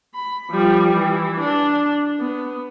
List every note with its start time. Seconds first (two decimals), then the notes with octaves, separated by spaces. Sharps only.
0.14 B5
0.51 F3 G3
0.96 E3
1.41 D4
2.20 B3